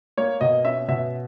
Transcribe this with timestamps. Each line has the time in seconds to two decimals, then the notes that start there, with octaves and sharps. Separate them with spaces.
0.17 A#3 C#5
0.41 B2 D#5
0.65 C#4 E5
0.88 B2 E5